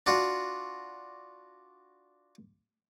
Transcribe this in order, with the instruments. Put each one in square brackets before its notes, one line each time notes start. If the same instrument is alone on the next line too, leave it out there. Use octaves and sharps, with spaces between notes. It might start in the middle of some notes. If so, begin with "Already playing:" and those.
[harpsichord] D4 F4 F#4